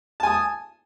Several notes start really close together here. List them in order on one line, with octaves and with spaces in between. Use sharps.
A5 G#5 D#6